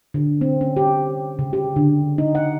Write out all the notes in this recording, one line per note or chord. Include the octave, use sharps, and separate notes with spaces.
D3
C4
C#4
G4
C#3
G4
D3
D#4
F#5